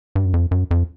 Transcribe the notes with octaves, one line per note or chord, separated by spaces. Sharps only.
G2
F#2
F2
F#2
F2